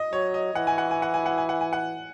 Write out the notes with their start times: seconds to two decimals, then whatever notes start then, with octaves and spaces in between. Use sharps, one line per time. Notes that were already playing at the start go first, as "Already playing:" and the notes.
Already playing: D#5
0.12 F#3 C#5
0.34 D#5
0.55 E3 F#5
0.67 G#5
0.78 F#5
0.91 G#5
1.02 F#5
1.14 G#5
1.26 F#5
1.38 G#5
1.49 F#5
1.61 G#5
1.73 F#5